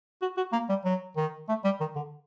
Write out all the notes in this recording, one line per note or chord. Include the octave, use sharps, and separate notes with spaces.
F#4
F#4
A#3
G3
F#3
D#3
A3
G3
D#3
D3